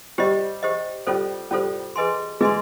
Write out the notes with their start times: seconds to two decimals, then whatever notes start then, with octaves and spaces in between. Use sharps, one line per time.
0.18 G3 G4 C5 D#5
0.62 G4 C5 D#5
1.07 G3 C#4 F4 A4 C5
1.51 G3 C#4 F4 A4 C5
1.96 G#4 B4 D#5 G#5 C6
2.41 G#3 G#4 B4 D#5 G#5 C6